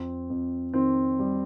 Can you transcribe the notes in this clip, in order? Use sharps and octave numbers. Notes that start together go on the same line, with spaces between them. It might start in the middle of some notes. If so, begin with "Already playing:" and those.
Already playing: F2 C4
F2
D#3 C4
G3